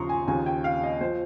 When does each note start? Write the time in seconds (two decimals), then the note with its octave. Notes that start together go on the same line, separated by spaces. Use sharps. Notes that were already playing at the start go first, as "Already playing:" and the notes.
Already playing: D#2 C#3 F3 A#5 C6 C#6 D#6
0.09 G#5
0.27 D#2 C#3 F3 G#5
0.46 G5
0.64 F5
0.83 D#5
1.01 F3 C5